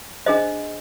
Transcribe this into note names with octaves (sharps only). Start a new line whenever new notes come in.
D4 G#4 C5 D#5